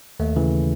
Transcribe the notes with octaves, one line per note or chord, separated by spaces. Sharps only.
D#2 A3
C#3 E3